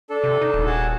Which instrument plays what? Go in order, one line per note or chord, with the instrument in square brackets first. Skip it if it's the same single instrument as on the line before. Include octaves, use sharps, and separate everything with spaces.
[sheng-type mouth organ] D4 A4
[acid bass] C3
D#4
D#1
[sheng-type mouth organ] F#4 G#4 A5